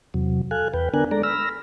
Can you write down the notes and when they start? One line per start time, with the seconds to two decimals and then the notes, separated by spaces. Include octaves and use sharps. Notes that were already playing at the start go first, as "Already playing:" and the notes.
0.14 E2 C3 F#3
0.51 A4 F5 G#5 F#6
0.74 E2 B4 G5
0.94 D3 B3 D4 A#4 G#5 F#6
1.11 G#3 A4 D5 A#5
1.23 B5 E6 F6 A#6